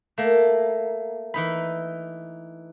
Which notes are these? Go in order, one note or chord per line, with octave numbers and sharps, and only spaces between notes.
A3 A#3
E3 D#4 B5